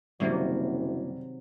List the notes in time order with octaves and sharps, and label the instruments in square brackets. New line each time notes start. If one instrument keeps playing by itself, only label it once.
[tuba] F#1 [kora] C3 D#3 F#3 [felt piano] G3 [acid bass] A#3